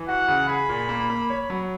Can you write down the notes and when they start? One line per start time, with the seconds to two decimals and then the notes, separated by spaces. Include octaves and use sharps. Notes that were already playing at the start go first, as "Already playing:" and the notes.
Already playing: E3
0.08 F#4 F#5
0.28 C#3
0.48 G#4 B5
0.69 A#2
0.89 A#3
1.10 A#3
1.30 C#5
1.50 F#3